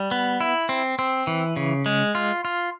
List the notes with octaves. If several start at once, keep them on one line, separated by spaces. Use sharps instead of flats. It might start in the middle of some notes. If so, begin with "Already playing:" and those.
Already playing: G3
B3
E4
C4
C4
E3
C#3
G#3
F4
F4